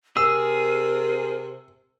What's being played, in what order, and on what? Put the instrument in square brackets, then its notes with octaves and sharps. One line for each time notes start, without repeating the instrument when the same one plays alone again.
[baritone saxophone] C3 [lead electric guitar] G#4 [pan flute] A#4 [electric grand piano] E6